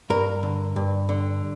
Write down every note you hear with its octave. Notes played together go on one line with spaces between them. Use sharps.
G2 A#4
D3
G2
D3